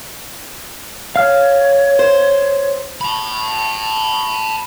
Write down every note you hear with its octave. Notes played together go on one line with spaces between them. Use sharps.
C#5 F5 F6
C5
A5 B5